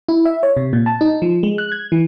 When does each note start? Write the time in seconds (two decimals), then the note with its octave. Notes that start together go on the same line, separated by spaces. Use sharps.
0.09 E4
0.25 E5
0.43 C#5
0.57 C3
0.73 A#2
0.86 A5
1.01 D#4
1.22 F3
1.43 G#3
1.58 F#6
1.72 G#6
1.92 E3